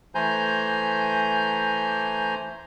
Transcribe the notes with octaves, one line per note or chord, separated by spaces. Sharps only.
E3 A3 C5 G#5 A#5 G6